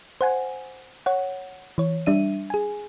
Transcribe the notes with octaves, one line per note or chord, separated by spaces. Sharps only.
C5 F#5 G#5
C#5 F#5
E3 C#5
G3 D4 E5 D#7
G#4 G#5